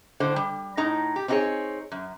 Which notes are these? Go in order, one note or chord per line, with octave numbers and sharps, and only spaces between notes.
A2 D3 C5
G3
A2 D#4 A#5
G4
C4 D4 D#4 F4 G#4 C#5
F#2